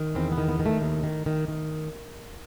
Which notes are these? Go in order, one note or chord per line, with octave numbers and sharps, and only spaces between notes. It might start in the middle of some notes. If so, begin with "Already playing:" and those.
Already playing: D#3
E2 C4
B3
D#3
B3
D#3
A3
D#2
D#3
D#3
D#3